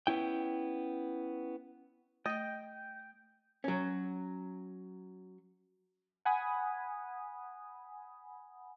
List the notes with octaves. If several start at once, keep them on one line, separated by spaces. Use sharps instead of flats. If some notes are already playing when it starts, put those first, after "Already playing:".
B3 C#4 E4 G5
A3 D#5 G5 D#6
F#3 C#4
F#5 G#5 B5 D#6